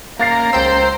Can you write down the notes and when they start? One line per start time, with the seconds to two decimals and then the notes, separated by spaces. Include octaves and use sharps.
0.19 A#3 C#4 F5 A#5 A6 C7
0.53 C#2 C5 G5 E6